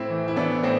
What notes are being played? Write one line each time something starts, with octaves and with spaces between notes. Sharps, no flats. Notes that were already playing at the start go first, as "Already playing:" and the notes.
Already playing: A2 C4 E4
E3
E4
E3 B3 D4
A2 C4